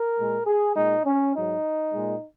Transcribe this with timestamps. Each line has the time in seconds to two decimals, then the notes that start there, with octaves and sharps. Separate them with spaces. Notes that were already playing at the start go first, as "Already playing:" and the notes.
Already playing: A#4
0.18 A#2 G#3
0.46 G#4
0.75 A#2 G#3 D#4
1.04 C#4
1.34 G#2 F#3 D#4
1.92 A#2 G#3